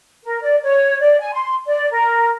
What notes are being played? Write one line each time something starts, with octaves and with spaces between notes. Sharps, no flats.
A#4
D5
C#5
D5
G#5
C6
D5
A#4